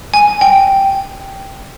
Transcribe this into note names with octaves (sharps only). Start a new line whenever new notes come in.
G#5
G5